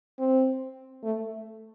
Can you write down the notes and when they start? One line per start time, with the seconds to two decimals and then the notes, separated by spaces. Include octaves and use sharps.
0.19 C4
1.04 A3